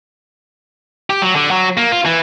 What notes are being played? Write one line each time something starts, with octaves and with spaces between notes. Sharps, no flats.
G4
F#3
D3
F#3
A#3
F4
E3